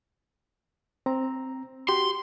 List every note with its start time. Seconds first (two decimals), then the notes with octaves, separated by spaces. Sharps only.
1.06 C4 A#5
1.88 F#4 G4 C6